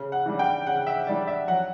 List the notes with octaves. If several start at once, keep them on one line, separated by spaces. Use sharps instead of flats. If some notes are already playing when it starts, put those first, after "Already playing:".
Already playing: C#3
F#5
E3 G3 D4
G5
C#3 F#5
E5
E3 G3 D4 D5
E5
F#3 F#5